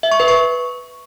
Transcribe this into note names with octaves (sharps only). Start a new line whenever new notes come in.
E5
C#6
B4
C#6